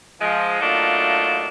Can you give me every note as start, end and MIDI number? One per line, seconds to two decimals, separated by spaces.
0.20 0.59 53
0.20 0.59 56
0.61 1.48 54
0.61 1.48 57
0.61 1.48 58
0.61 1.48 62
0.61 1.48 63
0.61 1.48 65